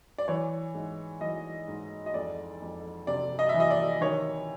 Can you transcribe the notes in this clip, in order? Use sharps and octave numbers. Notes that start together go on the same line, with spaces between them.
D5
E3 C#5
G#2
E3 D#5
G#2
D#5
F2 D5
F2
C3 D5
D#5
E3 E5
D#5
D5
D#3 C#5